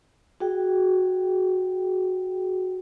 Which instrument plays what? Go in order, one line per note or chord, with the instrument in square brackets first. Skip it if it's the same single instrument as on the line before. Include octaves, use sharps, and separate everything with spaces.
[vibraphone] F#4 G#4 G5